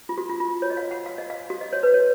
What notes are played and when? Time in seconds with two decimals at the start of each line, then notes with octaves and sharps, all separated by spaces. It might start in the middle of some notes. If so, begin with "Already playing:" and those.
0.09 F4
0.18 F#4
0.29 F4
0.40 F4
0.62 C#5
0.70 D#5
0.77 F5
0.91 F#5
1.06 F5
1.18 D#5
1.30 F5
1.50 F#4
1.61 D#5
1.73 C#5
1.83 B4
1.94 C#5